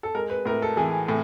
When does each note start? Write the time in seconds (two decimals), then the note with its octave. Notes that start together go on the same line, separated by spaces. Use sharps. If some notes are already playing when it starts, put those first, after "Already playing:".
0.03 A4
0.15 G#3 A#4
0.30 B4
0.45 A2 A#4
0.62 A4
0.77 E3 G#4
1.08 A2